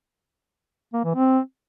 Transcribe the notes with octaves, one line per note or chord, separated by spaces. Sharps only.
A#3
E3
C4